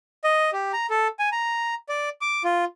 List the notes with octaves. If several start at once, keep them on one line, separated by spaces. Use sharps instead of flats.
D#5
G4
A#5
A4
G#5
A#5
D5
D6
F4